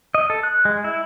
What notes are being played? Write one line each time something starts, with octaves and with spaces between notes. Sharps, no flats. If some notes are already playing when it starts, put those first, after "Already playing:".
D#5
A4
F#6
G#3
E4